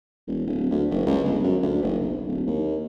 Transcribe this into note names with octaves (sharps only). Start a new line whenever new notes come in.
E1
D1
D2
F#1
C#2
G1
F#2
D2
F#1
B1
D1
D#2